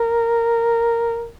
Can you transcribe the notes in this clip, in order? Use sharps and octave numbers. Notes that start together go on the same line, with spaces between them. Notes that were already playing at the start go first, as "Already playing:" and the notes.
Already playing: A#4